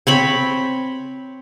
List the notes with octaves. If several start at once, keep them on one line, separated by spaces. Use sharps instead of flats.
C4 C#5 B5